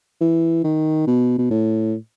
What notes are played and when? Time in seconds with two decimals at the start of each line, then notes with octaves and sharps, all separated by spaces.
0.21 E3
0.64 D#3
1.07 B2
1.38 B2
1.51 A2